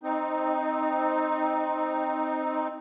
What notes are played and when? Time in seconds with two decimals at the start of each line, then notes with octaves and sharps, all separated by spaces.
0.03 C4 D#4